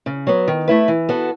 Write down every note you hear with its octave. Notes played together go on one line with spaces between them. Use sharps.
C#3
F#3 B3
D#3
A3 E4 B4
E3
B3 F#4 A4